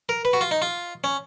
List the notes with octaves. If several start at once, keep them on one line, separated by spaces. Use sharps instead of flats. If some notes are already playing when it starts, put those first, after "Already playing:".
A#4
B4
F#4
F4
D#4
F4
C#4